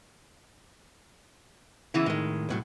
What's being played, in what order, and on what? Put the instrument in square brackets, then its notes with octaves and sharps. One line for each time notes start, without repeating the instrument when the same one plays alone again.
[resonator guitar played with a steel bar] C#3 E3 B3 [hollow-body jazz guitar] E4
[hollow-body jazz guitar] A2 D#3 [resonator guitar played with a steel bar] G#3
[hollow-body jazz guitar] C2 A2 F#3